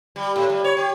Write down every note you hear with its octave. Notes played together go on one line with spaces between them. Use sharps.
G3
A2
G3
C#5
G4